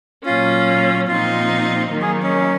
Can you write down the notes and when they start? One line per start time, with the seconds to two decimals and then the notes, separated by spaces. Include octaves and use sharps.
0.25 A#2 F#3 C#4 F4
1.08 A#2 F3 C4 D#4 F4
1.91 D#3 F#3 A#3
2.02 G#4
2.23 C#4